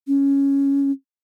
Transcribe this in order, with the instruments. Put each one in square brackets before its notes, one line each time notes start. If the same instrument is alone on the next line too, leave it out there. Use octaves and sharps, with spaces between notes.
[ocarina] C#4